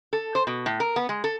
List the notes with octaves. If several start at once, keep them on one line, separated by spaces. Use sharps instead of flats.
A4
C5
B2
A2
A#4
B3
G#3
A4